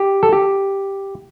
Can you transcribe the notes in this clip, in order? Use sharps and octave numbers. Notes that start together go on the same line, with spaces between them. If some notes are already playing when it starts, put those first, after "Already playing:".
Already playing: G4
A4
G4